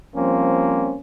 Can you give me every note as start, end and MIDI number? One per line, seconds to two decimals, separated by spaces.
0.16 0.96 53
0.16 0.96 55
0.16 0.96 58
0.16 0.96 60
0.16 0.96 61